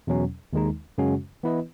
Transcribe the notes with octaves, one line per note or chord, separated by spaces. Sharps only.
E2 B2 F#3 C#4
D#2 D#3 G#3 D#4
F#2 C#3 G#3 C#4 F#4
E3 B3 E4 B4 D#5